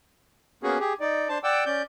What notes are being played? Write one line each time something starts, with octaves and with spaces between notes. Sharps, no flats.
A#3 B3 C#4 F#4 G#4
G4 G#4
D#4 D5
D4 C5 A5
D5 F#5 G5 D6 E6
C#4 D5 G6